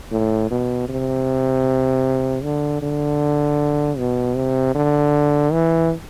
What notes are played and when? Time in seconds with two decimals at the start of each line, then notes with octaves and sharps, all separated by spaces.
0.12 A2
0.51 B2
0.89 C3
2.43 D3
2.82 D3
3.98 B2
4.36 C3
4.75 D3
5.52 E3